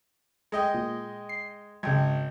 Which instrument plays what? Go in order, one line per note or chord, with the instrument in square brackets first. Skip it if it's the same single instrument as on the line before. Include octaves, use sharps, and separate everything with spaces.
[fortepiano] G#3 D#5 G5
[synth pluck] A#2
C7
[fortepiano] G#1 [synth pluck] C#3 G5 G#6